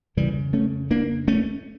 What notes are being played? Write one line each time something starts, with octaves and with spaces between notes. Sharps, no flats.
F2 C#3 E3 G3
A3 C#4
A#3 D4
A3 C#4